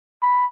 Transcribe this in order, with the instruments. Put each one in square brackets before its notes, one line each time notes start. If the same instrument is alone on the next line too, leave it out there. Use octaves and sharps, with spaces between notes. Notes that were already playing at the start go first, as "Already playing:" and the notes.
[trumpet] B5